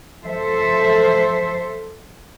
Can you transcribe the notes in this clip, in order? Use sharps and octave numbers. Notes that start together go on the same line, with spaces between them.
F3 A4 C5 E5